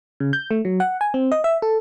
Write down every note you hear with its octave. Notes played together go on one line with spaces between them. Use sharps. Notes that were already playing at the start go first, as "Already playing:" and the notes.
C#3
G6
A3
F#3
F#5
G#5
C4
D#5
E5
A4